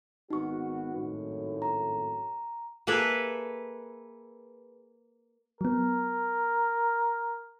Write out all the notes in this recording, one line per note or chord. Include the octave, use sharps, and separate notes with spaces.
G#1 B3 D#4 F#4 C#6
G#1 F#2 A2
A#5
A#3 G#4 A4 B4 E5
F#3 B3 A#4